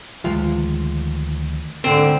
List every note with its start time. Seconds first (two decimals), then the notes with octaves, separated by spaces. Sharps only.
0.24 D2 D#3 F3 G#3 F4
1.84 D2 G#2 D3 C4 G5